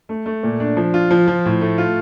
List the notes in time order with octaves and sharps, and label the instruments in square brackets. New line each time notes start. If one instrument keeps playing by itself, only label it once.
[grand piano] A3
A3
A#2
D4
F3
F4
F3
F3
A2
A3
F4